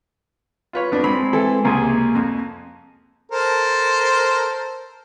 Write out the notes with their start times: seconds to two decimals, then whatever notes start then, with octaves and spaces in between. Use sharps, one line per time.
0.73 F4 B4 C#5
0.92 F2 B3 D4
1.04 G#3 C4 B5
1.33 E3 A4
1.65 C#2 C3 A#3 G#4 G#5
2.15 F2
3.32 A4 A#4 C5